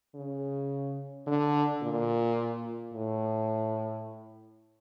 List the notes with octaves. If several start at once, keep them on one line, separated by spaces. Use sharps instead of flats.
C#3
D3
A#2
A2